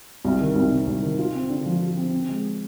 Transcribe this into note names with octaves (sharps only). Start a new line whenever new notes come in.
C2
D#3
C2
C3
C2
D#3
F4
C4
D3
F3
F4
C4
C4
G#3